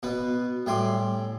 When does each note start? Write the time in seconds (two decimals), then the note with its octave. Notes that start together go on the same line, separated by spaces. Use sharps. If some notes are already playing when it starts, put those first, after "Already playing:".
0.03 B2 B3 B4
0.66 A2 G3 E5 G#5 C6 D6